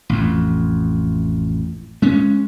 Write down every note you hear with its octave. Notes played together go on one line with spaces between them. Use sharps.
A1 F2
G#3 C#4